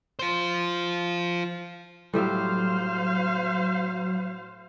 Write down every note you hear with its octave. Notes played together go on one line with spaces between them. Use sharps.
F4 C5
A2 F#3 G3 C5 E5 F5